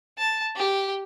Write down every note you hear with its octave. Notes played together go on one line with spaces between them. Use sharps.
A5
G4